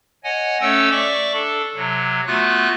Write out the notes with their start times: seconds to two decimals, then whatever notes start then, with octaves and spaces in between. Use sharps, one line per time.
0.24 C#5 D#5 F#5 G#5
0.61 A3 C#4 A4 C#5 G5 E6
0.91 D5 E5 C#6 D6
1.33 D4 A4
1.75 C3 F#3
2.27 A3 B3 F4 F#4 F#6